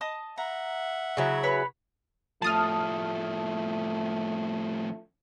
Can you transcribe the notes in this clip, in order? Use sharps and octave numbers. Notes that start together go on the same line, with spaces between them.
D#5 A5 D#6
E5 F#5 A#5
C#3 F#3 E4
B4 C#5 B5
A2 F3 A3 A5 D#6 F6